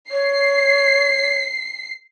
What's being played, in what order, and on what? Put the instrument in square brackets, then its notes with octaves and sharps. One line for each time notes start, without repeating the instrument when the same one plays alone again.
[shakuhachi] C#5 [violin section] C7